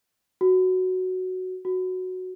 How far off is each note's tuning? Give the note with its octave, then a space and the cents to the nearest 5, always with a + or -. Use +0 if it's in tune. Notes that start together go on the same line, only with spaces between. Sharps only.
F#4 +0
F#4 -5